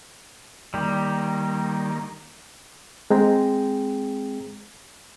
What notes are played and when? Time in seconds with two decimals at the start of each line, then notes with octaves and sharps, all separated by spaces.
0.74 D#3 G3 A#3 G4
3.10 G#3 C4 G#4 G5 A#5